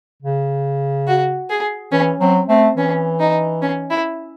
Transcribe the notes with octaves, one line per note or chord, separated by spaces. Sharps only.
C#3
F#4
G#4
E3 C#4
F#3 C4
A3 C4
E3 C#4
D#4
C#4
E4